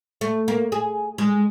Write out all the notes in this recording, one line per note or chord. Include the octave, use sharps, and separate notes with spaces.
A3
A#3
G#4
G#3